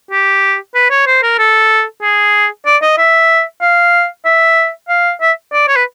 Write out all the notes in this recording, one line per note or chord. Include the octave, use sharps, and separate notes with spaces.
G4
B4
C#5
C5
A#4
A4
G#4
D5
D#5
E5
F5
E5
F5
E5
D5
C#5
B4